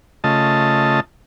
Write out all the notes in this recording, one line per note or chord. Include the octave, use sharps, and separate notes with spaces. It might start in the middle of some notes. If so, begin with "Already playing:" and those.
C#3 A3 F4 D#5 A5